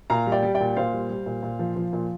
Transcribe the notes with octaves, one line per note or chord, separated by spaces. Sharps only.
A#2 F5 A#5
G3
D5 G5
G3
D5 G5
A#2
A#2 C5 F5
G3
G3
A#2
A#2
F3
F3
A#2